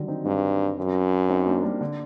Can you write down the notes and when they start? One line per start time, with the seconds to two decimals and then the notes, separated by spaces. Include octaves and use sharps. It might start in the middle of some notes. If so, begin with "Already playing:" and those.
Already playing: D3 D#3 F#3 G3
0.08 C4 D#4
0.25 G2 C4 D#4
0.78 F#2
1.29 C4 D#4
1.46 A#3 D4
1.63 G3 A#3
1.81 D3